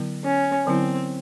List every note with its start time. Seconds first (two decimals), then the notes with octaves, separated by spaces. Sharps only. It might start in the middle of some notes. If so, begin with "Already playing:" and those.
Already playing: D3 F#3 B3 E4
0.24 C#4
0.66 D3 F#3 B3 C4 E4